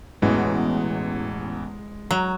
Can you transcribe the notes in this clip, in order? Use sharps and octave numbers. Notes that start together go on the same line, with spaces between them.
A1 E2 B2 E3 G#3
F#3 A#5